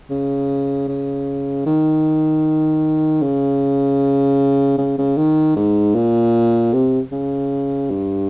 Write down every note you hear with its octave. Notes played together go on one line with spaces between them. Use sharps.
C#3
C#3
D#3
C#3
C#3
C#3
D#3
G#2
A#2
C3
C#3
G2